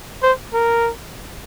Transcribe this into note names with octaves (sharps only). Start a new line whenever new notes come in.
C5
A#4